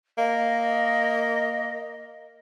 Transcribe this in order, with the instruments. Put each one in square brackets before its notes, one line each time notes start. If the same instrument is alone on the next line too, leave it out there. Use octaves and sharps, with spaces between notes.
[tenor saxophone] A#3 [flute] D#5